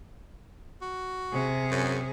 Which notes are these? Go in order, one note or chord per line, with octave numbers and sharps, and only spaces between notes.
F#4
C3 G#4
F#2